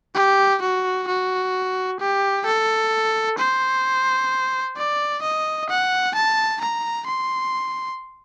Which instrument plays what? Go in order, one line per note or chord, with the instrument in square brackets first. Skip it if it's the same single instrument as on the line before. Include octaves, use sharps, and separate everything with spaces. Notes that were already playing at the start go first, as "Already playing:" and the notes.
[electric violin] G4
F#4
F#4
G4
A4
C5
D5
D#5
F#5
A5
A#5
C6